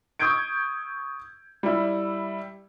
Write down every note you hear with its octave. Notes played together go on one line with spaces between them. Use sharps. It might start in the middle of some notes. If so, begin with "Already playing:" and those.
C#6 D#6 E6 G6 G#6 D7
G3 E4